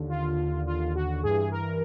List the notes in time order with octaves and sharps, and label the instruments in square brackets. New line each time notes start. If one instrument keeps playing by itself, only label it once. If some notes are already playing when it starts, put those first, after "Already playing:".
Already playing: [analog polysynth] D#2 D3
F4
F4
F#4
G2 E3 G#4
A#4